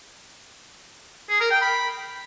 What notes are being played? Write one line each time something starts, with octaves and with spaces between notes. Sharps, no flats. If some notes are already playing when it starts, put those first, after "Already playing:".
G#4
A#4
G5
B5